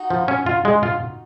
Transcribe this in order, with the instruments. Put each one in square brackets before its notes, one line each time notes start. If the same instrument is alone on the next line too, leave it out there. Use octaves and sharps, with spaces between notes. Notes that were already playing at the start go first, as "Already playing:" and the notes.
Already playing: [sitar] D#4 F#4
[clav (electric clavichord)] F3
C#4
F4
G#3
F4